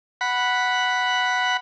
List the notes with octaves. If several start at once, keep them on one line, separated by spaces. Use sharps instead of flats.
F#5 B5